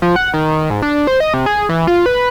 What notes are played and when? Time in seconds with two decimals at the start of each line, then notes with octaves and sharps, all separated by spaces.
0.02 F3
0.16 F#5
0.34 D#3
0.70 G#2
0.82 D4
1.07 C5
1.20 D#5
1.34 C3
1.46 G#4
1.69 E3
1.87 F4
2.06 B4